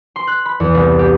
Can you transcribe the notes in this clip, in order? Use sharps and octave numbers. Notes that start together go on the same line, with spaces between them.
C6
F#6
B5
E2
C2
G4